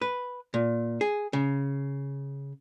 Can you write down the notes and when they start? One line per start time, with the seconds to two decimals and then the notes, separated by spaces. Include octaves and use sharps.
0.01 B4
0.54 A#2
1.01 G#4
1.33 C#3